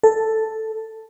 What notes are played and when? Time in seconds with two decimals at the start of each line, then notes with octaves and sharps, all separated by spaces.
0.03 A4